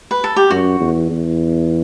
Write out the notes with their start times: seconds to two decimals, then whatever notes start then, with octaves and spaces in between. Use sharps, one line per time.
0.11 B4
0.24 A4
0.36 G4
0.50 F#2 F#4
0.80 E2
1.11 E2